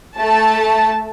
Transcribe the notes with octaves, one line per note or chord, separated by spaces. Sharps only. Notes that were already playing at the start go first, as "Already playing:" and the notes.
A3 A5